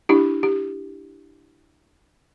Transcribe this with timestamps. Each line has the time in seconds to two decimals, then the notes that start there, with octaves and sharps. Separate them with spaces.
0.09 D4 E4 G4
0.43 G4